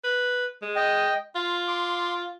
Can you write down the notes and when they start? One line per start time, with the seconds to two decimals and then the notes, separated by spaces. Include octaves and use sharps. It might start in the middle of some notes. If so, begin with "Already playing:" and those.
0.04 B4
0.62 G#3
0.76 D#5 G5
1.35 F4 C6
1.68 C6 D6